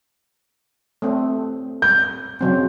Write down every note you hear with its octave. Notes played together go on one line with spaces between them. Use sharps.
A3 C4
G6
C#3 F#3 C4